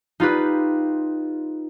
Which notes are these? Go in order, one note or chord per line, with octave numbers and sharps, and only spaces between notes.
D#4 F4 G4 B4